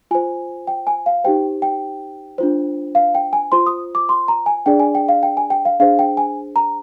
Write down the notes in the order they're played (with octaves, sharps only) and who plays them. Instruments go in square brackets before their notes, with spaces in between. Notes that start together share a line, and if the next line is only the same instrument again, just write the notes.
[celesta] F4 C5 G#5
G5
G#5
F5
D#4 G4 C5 G5
G5
D4 F4 C5
F5
G5
G#5
F4 C5 C6
D#6
D6
C6
A#5
G#5
D4 G#4 D5 G5
G#5
G5
F5
G5
G#5
G5
F5
D4 G#4 C5 F5
G5
G#5
A#5